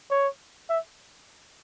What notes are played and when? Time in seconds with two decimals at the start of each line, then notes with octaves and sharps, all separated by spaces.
0.10 C#5
0.70 E5